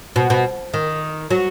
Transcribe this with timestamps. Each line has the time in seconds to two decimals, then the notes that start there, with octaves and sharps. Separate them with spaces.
0.16 B2
0.30 B2
0.74 D#3
1.31 F#3